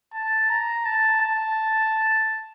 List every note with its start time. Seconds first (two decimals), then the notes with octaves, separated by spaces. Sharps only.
0.14 A5
0.50 A#5
0.86 A5
1.21 A5